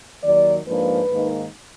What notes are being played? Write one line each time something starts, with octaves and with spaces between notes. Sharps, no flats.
D#2 D#3 F#3 D5
G#2 F3 A#3 D4 B4
G#2 D#3 A#3 D#4